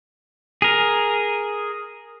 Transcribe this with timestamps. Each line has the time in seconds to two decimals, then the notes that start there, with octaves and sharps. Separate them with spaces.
0.62 G#4 A#4